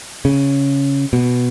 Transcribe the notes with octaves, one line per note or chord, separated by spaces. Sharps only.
C#3
B2